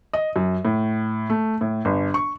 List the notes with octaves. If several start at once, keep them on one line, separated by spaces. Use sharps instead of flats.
D#5
F#2
A2
A3
A2
G1
C#6